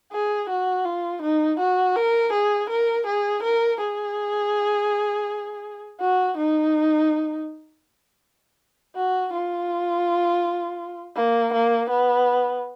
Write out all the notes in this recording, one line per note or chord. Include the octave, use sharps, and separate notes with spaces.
G#4
F#4
F4
D#4
F#4
A#4
G#4
A#4
G#4
A#4
G#4
F#4
D#4
F#4
F4
A#3
A#3
B3